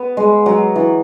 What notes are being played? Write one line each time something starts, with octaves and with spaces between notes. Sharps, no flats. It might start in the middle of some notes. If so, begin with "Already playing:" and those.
Already playing: B3
G#3
F#3
E3